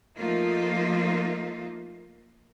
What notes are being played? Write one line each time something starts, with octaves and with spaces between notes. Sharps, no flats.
F3 A3 A#3 D#4 F4